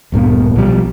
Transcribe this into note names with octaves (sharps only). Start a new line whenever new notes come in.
D1 G2 A#2 B3
B1 B2 F3 G3